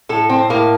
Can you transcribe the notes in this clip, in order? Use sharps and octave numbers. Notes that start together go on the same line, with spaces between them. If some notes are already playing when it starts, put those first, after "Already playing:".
A2 A4
C4
A2 A#3